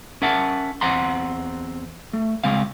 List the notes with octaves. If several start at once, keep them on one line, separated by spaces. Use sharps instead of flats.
C#4 A#4 E5 F#5 A5
E2 C4 F#5 A#5 C6
A3
C#2 C#3 G#3 C4 F5